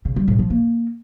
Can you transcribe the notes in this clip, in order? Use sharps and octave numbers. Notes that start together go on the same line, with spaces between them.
C#3
G3
A2
F3
A#3